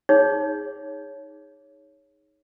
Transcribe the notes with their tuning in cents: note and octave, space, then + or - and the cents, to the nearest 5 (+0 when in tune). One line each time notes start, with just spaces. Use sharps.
D#4 +5 G#4 -10 C#5 +0